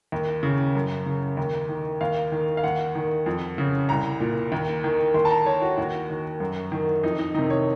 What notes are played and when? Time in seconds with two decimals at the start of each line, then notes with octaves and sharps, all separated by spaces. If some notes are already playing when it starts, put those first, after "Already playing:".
0.12 D#2
0.43 C#3
0.75 F#2
1.06 C#3
1.37 D#2
1.69 D#3
2.01 D#2 F5
2.32 D#3
2.57 F5
2.64 D#2 F#5
2.95 D#3
3.26 F2
3.58 C#3
3.89 C2 A#5
4.20 A#2
4.52 D#2
4.84 D#3
5.14 D#2 C6
5.25 A5
5.30 A#5
5.46 D#3 C#5
5.62 F#4
5.78 D#2 F#4
6.10 D#3
6.40 F#2
6.72 D#3
7.03 F2 D#4
7.19 D#4
7.34 C3 D#3 D#4
7.50 C#5